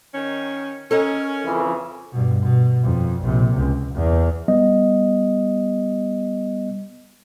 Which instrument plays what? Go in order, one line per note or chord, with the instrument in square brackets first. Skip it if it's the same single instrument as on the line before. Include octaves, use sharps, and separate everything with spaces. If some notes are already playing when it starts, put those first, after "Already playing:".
[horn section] D#3 C#4
[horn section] C#4 [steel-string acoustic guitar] A4 A#4 D#5
[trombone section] F2 C#3 E3
[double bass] G2 B2
B2
F2
A#1 C3
C#2
E2
[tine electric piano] G3 B3 D#5